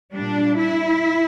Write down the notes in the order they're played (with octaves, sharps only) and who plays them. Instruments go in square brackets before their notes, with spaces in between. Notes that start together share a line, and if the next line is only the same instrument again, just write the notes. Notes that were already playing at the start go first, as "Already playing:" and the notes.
[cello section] A#2 G3 D4
E4